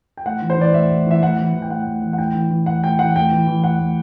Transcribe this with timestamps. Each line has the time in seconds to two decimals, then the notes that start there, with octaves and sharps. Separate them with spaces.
0.17 G5
0.26 A2 F#5
0.42 E3
0.50 C5
0.58 E3 D5
0.73 A2 E5
0.91 A2
1.07 E3 E5
1.22 A2 F#5
1.39 E3
1.54 E3
1.62 G5
1.70 A2 F#5
1.86 A2
2.02 E3
2.13 F#5
2.18 A2 G5
2.35 E3
2.51 E3
2.66 A2 F#5
2.84 A2 G5
2.99 E3 F#5
3.16 A2 G5
3.31 E3
3.48 E3
3.64 A2 F#5
3.80 A2